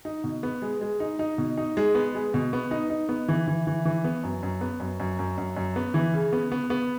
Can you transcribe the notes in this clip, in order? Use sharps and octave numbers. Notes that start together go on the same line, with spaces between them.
D#4
B2
B3
G#3
G#3
D#4
D#4
B2
D#4
G#3
B3
G#3
B2
B3
D#4
D#4
B3
E3
E3
E3
E3
B3
F#2
F#2
B3
F#2
F#2
F#2
F#2
F#2
B3
E3
C#3
B3
B3
B3